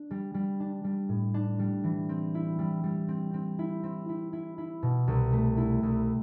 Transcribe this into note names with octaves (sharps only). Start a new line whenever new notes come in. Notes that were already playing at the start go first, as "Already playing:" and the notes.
Already playing: D4
G3
G3
D4
G3
A2
D4
G3
E3
C4
E4
G3
G3
C4
C4
E4
C4
E4
E4
E4
B2
C2
A3
E4
C2